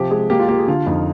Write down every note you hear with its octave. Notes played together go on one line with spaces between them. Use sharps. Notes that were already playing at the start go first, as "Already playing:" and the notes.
Already playing: C3 F3 G4
G#3 G#4
A#3 G4
F4
A#3 G4
G#4
D3 F4
F2 D#4